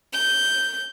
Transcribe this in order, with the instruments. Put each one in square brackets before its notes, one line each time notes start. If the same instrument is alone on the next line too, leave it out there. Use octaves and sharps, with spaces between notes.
[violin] G6